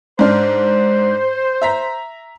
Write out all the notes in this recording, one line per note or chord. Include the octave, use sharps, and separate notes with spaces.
G#2 D4 C5 F6
E5 A#5 B6